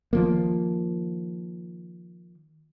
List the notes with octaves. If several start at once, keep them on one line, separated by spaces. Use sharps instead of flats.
D#3 F3 A#3